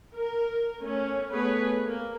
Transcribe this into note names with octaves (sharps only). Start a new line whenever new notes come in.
A#4
A3 C#4
A3 B3 G#4 B4 C#5
A#3